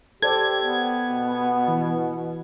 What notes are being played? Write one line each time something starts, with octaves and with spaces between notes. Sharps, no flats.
G4 A4 C5 D5 G#6
B3
B2
E3